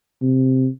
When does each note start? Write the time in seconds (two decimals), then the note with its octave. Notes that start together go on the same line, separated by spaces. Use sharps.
0.22 C3